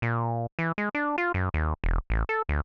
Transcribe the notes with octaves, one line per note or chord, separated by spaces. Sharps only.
A#2
E3
G#3
D4
F4
F#2
D#2
E1
A1
A4
D2